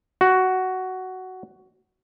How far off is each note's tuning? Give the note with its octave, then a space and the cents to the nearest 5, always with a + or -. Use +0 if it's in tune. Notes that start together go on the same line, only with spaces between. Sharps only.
F#4 +10